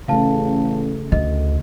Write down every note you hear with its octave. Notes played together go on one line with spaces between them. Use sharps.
A1 C#3 A3 F5 A5
D2 D#5